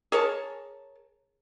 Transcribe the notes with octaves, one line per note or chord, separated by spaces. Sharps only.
G#4 A#4 C#5 A5